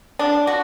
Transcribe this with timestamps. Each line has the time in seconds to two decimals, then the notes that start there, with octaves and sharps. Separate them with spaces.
0.19 D4
0.47 F#4